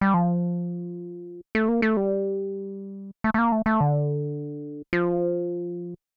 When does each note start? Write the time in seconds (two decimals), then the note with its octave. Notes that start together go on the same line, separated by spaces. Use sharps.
0.01 G3
0.14 F3
1.55 A3
1.68 A#3
1.82 A3
1.97 G3
3.24 A3
3.34 A3
3.38 A#3
3.52 A3
3.66 A3
3.81 D3
4.93 F3